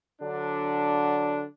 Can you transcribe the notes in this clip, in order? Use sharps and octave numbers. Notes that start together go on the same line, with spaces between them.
D3 F#3 D4